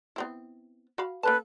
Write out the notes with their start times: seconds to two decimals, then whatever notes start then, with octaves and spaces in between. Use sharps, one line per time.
0.16 B3 C4 E4
0.98 F#4 F5 B5
1.23 A#3 C#4 A4 B4 A5